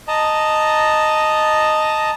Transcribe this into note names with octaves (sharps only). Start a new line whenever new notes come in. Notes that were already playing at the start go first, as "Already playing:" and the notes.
D#5 A5 A#5